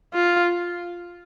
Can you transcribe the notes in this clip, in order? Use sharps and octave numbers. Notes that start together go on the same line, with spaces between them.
F4